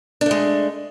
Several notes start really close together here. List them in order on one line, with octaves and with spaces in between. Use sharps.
D4 A3 G#3